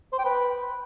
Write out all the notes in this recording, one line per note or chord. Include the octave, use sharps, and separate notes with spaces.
C5
G5
B4